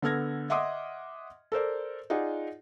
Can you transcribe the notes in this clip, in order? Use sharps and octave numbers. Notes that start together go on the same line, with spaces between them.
D3 B3 A4 F6 G#6 A#6
D#5 E5 F#5 C6 D6 D#6
A4 A#4 C5 D5
D#4 F4 G#4 D5 F#5